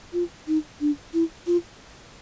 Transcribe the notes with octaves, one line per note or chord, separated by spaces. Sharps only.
F4
D#4
D4
E4
F4